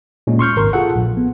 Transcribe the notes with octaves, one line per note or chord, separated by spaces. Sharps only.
A#2 G#3 C#4
C6 C#6 F6 G6
G#1 A#4 C6
F4 G#4 A4 F#5
A#1
B3